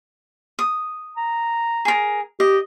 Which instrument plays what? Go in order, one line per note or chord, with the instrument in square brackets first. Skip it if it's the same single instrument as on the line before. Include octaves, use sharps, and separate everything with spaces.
[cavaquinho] D#6
[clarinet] A#5
[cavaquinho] G#4 A#4
[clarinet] G4 [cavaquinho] D#5